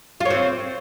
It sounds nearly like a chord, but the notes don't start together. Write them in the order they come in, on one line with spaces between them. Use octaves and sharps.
F4 C#5 C4